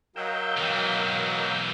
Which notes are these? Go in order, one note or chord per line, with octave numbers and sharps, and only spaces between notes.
F#3 A#4 D#5 F5 G5 E6 G6
B1 E3